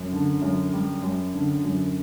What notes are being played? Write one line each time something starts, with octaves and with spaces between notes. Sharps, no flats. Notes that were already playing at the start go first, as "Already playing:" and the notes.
Already playing: F#2
D3
F#2
G3
F#2
D3
F#2